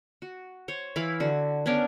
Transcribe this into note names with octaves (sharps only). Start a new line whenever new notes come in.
F#4
C5 C#5
E3 E4 F5 B5
D3 F#4
B3 C#4 D4 A#4